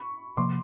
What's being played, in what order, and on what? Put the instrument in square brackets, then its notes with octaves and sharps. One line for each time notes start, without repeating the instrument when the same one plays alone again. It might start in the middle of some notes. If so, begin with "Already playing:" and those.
Already playing: [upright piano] B5 C#6
[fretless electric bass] C3 F3 A#3 [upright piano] C6 D6